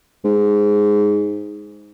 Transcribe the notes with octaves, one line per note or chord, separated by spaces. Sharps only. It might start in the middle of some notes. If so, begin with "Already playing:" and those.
G#2